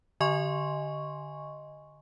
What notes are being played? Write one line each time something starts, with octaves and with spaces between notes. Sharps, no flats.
D3 D#5 G#5 C6 C#6